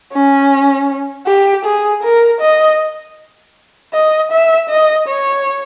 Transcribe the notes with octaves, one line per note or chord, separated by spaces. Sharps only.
C#4
G4
G#4
A#4
D#5
D#5
E5
D#5
C#5